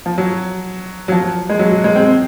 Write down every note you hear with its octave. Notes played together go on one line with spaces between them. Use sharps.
F3
F#3
F#3
F3
G#3
F#3
F#3
G#3
C4